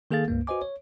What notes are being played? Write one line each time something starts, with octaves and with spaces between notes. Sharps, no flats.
D#3 A#3 G#4 A4 F5 A6
C#2 G2 A#3
F#4 B4 C5 D#5 G#5 D6
C#5